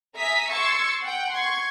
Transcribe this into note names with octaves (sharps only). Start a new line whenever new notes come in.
E5 G#5 A#5 D#6 B6
C6 C#6 E6 G#6 A6 C#7
F#5 G5
C6 C#6 G#6